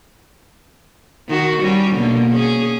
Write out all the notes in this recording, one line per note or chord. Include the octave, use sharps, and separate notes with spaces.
D#3 F#4
G3 C#4
B2 D3 A#3
C#4 G#4